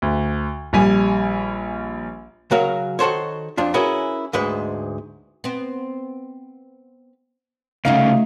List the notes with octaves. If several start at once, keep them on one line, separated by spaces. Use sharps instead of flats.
D2
A#1 G3 G#5
C#3 F#3 F#4 A#4 F5
D#3 F#4 A4 C5 C#5
F2 D4 F4
C#4 E4 F#4 G#4 A#4 B4
D2 G#2 G#3 B4
B3 C4
C2 C#3 A3 D#4 F#4 F5